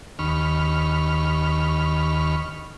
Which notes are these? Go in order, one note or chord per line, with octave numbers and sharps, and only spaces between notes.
D#2 B5 C#6 F6